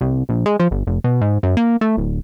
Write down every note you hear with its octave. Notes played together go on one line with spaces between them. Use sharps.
C2
A#1
G#3
F3
G1
F1
B2
G#2
F#2
A#3
A3
D1